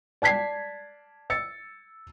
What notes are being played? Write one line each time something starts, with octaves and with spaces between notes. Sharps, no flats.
D5 A5 G#6 B6 C7
E6 A6 C#7